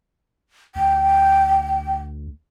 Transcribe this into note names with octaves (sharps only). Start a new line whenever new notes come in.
D2 G5